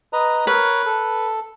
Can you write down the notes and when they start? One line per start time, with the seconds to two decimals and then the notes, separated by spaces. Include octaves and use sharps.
0.13 B4 D#5 A#5
0.47 A#4 B4 C#5
0.86 A4